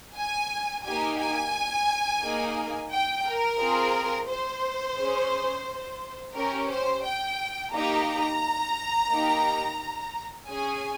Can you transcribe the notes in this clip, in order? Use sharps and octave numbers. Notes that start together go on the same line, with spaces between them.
G#5
A#3 D#4 G4 G#5
G#5
A#3 D#4 G#4
G5
A#4
C4 F4 G#4
C5
C#4 G#4
C#4 G4 A#4
C5
G5
A#3 D#4 G4 A#5
A#3 D#4 G4
C#4 G#4 G#5